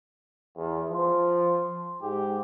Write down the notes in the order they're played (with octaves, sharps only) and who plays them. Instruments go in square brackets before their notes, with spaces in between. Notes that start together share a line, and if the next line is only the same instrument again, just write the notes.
[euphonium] E2
[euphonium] F3 [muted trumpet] C6
[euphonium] G#2 [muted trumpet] G4